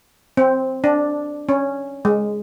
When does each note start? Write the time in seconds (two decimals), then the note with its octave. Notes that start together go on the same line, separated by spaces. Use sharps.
0.37 C4
0.84 D4
1.49 C#4
2.05 G#3